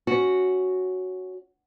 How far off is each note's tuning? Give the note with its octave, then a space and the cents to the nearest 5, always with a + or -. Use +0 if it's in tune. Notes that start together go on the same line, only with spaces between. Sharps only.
C#4 +0 F#4 +0